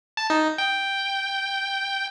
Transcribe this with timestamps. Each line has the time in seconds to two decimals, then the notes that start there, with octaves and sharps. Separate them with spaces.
0.17 A5
0.30 D#4
0.58 G5